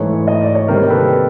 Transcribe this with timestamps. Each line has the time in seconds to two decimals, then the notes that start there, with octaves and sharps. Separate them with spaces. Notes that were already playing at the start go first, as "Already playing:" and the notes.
Already playing: G#2 E3 A3 B4 C#5
0.27 D#5
0.41 D5
0.55 C#5
0.68 C3 D#3 G3 A#3 A#4 C5
0.90 A4 B4